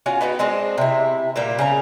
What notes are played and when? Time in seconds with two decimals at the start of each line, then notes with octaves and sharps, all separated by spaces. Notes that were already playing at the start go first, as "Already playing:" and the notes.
0.06 C#4 F4 F#4
0.21 B3 D#4 F#4 G5
0.39 G#3 C4 D4 D#5
0.78 C3 E4
1.36 A#2 G3 A#3
1.59 C#3 C#4 A#5